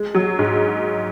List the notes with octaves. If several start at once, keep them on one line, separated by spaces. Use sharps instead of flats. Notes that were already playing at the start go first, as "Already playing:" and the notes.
Already playing: G#3
F#3
G#2